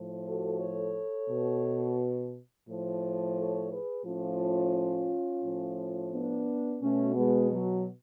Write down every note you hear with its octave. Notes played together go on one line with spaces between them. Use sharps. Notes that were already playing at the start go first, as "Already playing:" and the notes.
Already playing: A2 F3
F#4 A4
A4 C#5
B2
A2 F3
A4 C#5
G#4 B4
A2 F3 C#4 F4
A2 F3
B3 D4
B2 A3 C#4
G#3 B3
F#3